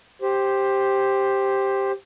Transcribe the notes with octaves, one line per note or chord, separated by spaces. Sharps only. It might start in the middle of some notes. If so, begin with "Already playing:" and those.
G4 C5